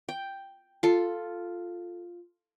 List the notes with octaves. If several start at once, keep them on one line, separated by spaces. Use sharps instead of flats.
G5
F4 A4